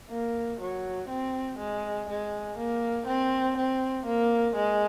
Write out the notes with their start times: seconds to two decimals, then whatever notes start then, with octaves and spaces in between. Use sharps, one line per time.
0.10 A#3
0.60 F#3
1.09 C4
1.58 G#3
2.09 G#3
2.57 A#3
3.07 C4
3.57 C4
4.06 A#3
4.56 G#3